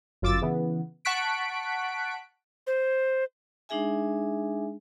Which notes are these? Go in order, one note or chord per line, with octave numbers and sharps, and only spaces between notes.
G1 F#2 F4 D6 E6 A6
C#3 E3 B3
F#5 A5 C#6 F#6 B6 D7
C5
G#3 D4 D#4 G#4 E5 G#5